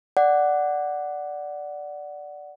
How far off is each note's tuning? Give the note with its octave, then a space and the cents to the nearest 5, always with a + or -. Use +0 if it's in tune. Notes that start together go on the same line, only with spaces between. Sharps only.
D5 +0 F#5 +5